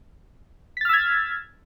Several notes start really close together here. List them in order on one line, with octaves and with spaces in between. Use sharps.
B6 A6 F6 E6 G#6